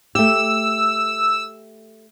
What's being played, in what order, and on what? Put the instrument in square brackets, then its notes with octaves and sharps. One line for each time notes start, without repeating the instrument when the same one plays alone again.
[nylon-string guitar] A3 G4 [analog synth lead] E6